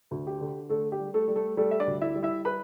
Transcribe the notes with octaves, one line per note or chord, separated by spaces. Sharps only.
D2
G4
D3
D3 A3 A4
G4
G3
A3 A4
G3
A3 A4
G3 A3 A4
E5
D4 D5
D2
E4 E5
G3
E4 E5
B4 B5